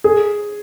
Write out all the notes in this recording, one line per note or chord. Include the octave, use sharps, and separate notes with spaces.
G#4